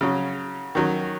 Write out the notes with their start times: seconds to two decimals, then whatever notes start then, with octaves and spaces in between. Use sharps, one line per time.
0.01 C#3 F#3 C#4
0.75 D#3 F#3 C#4